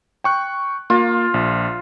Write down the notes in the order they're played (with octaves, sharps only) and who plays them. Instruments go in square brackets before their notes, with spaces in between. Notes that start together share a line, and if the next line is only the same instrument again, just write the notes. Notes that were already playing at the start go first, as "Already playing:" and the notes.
[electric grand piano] G5 C#6 F#6
[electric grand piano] A#3 [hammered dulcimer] F4
[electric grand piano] A#1